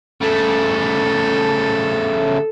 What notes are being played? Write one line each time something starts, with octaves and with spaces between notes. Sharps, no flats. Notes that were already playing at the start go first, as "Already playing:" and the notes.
C#3 A3 A4